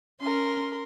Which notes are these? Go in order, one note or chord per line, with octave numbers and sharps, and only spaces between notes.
C#4 A#4 C6